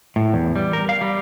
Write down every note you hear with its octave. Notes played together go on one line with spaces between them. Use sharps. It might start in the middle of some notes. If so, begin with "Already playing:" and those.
A2
E2
G3
A#4
F5
G3